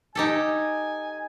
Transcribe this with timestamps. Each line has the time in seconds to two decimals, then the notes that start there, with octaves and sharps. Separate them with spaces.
0.15 D#4 G4 A4 G#5